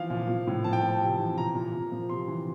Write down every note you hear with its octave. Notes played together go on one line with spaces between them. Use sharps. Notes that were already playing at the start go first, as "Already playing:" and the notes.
Already playing: E3 F3 F5
A#2
F3
A2
F3 A5
G5
F3 A5
C3
E3
A#2 A#5
A#2
A#2
F3
C3 C6
E3